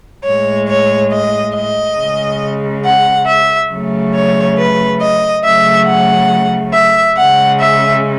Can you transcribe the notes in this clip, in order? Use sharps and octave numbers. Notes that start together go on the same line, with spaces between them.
A2 G#3 C#5
C#5
D#5
D#5
C#3 G#3
F#5
E5
C#3 F#3 A3
C#5
B4
D#5
C#3 F#3 A3 E5
F#5
E5
C#3 G#3 F#5
E5